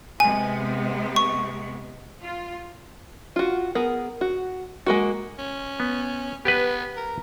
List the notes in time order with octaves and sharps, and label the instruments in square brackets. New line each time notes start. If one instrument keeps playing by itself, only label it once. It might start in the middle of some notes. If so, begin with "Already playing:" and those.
[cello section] C3 G#3 B3 [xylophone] G#5
[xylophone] C#6
[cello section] F4
[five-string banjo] F4 F#4
B3 G#4 A#4
F#4
G#3 A#3 F#4
[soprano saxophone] C#4
[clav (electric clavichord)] B3
[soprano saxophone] B3 [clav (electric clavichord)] G4 B4
[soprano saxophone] A#4